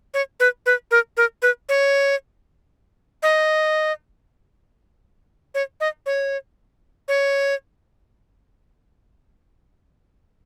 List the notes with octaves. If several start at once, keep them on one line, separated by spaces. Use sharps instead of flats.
C#5
B4
B4
A#4
A#4
B4
C#5
D#5
C#5
D#5
C#5
C#5